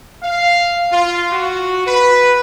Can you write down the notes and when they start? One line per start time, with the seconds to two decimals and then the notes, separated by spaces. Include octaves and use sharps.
0.23 F5
0.91 F4
1.31 F#4
1.85 B4